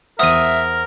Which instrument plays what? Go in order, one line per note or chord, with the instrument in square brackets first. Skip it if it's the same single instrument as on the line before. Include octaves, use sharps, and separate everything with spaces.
[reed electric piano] E2 C5 F#5 [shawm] A#4 [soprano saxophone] E5 [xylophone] D#6 D#7